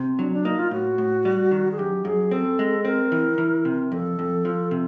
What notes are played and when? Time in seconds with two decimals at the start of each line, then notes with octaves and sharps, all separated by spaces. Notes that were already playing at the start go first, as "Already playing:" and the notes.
Already playing: C3
0.18 F#3 D4
0.32 D4
0.45 A#3 D#4
0.59 F4
0.71 A2 F#4
0.98 A2
1.25 G3
1.51 D#3
1.72 G#4
1.78 F#2 G4
2.05 F#2 G#4
2.31 C4 A4
2.59 G#3
2.85 C4 A#4
3.12 E3
3.38 E3
3.65 C3
3.92 F2 A4
4.19 F2
4.45 F3
4.71 C3